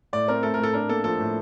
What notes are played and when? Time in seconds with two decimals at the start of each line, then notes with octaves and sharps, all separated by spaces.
0.13 A2 D5
0.28 C4 A#4
0.43 A3 A4
0.54 A#4
0.59 A2 A4
0.73 D4 A#4
0.89 A#3 A4
1.04 F3 A4
1.19 A2